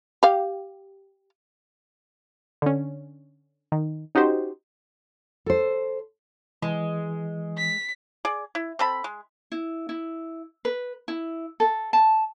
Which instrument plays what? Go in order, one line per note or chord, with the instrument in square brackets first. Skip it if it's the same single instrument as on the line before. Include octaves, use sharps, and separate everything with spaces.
[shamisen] G4 F5
[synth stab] D3 C#4
D#3
C#4 D#4 F#4 G4 C5
[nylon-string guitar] A4 C5
[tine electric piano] E3 [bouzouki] G#3
[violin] B6
[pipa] G#4 D5
E4
C4 A4 B5
G#3
[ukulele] E4
E4
B4
E4
A4
A5